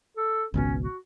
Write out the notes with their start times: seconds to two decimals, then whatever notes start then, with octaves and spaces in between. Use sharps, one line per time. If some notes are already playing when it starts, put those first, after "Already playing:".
0.17 A4
0.54 G#1 C#2 B2 C#4
0.82 F#4